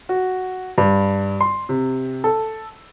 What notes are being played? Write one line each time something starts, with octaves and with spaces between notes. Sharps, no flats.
F#4
G2
C6
C3
A4